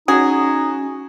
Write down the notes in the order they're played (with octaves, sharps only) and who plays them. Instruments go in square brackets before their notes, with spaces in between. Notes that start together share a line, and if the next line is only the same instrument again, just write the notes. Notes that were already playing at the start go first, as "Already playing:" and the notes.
[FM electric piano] C#4 [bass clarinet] D#4 [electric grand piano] F#4 [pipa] G#4